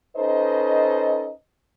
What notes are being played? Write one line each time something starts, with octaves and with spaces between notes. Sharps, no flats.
C#4 D#4 A4 B4 C5 D#5